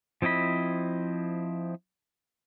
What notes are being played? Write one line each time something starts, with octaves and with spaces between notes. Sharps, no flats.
F3 C4 E4 D#5 B5